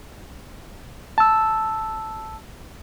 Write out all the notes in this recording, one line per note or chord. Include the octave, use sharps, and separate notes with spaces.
A5 E6